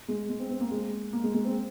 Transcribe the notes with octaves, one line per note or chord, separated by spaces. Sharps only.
G#3
G#3
C4
C4
A#3
G#3
A#3
G#3
G#3
C4